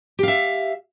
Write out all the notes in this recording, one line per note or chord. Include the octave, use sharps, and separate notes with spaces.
G4 E5 F5